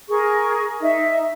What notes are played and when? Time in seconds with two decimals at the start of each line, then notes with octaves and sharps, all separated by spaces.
0.09 G#4 A#4 C#6
0.81 D#4 E5